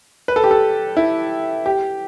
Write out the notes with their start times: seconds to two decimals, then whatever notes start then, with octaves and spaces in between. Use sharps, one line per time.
0.28 B4
0.36 A4
0.44 G4
0.51 A4
0.97 E4
1.66 G4